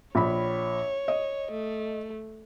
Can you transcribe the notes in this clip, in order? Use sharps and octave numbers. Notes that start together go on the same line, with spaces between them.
A#1 C#5 B5
D#5
A3